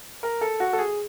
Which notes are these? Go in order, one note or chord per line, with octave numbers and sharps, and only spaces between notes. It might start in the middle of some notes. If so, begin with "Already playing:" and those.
A#4
A4
F#4
A4
G#4